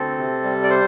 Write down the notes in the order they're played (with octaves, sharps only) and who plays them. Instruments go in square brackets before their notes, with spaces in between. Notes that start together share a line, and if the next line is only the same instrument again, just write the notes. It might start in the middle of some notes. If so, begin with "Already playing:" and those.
Already playing: [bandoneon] D2 C4 A4
C3
G3
D5
C5